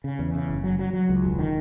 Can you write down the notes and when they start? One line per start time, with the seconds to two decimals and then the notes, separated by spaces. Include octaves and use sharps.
0.04 C#3
0.19 E2
0.35 C#3
0.49 F#1
0.64 F#3
0.79 F#3
0.93 F#3
1.09 C#2
1.24 E1
1.39 D#3